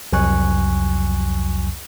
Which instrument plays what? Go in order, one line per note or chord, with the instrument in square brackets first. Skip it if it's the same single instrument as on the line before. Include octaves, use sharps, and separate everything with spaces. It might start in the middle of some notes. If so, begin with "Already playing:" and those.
[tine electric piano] C2 F2 F#3 G#5 C#6 F#6